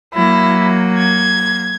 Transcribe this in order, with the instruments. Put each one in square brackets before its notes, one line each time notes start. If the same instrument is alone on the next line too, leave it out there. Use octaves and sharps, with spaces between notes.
[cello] F#3 A#3 [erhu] E4
[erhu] G#6